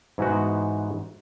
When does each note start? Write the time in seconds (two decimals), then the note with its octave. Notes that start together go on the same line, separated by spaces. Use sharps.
0.18 G#2 E3 G#3 B3 D#4 F#4